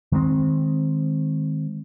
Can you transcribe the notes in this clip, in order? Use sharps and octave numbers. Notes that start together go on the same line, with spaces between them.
D#3 G#3 A#3 C4